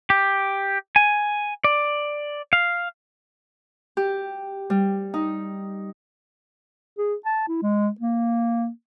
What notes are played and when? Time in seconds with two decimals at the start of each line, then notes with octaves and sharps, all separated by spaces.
0.10 G4
0.96 G#5
1.64 D5
2.53 F5
3.97 G4
4.70 G3
5.14 D#4
6.98 G#4
7.26 A5
7.48 E4
7.63 G#3
8.00 A#3